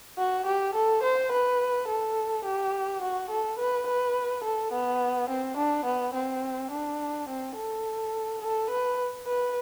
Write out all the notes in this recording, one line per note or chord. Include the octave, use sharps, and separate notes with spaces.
F#4
G4
A4
C5
B4
A4
G4
F#4
A4
B4
B4
A4
B3
C4
D4
B3
C4
D4
C4
A4
A4
B4
B4